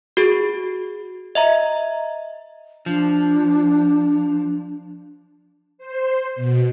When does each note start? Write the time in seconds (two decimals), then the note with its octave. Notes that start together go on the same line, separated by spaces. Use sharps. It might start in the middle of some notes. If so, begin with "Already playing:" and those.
0.17 F#4 G#4
1.35 D#5 E5 A#5
2.86 F3 D4
5.78 C5
6.36 B2